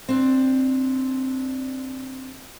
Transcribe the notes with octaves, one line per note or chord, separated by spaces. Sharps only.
C4 D4